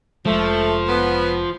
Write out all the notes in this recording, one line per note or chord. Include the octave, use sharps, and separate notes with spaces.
F1 F3 G#3 A3
B3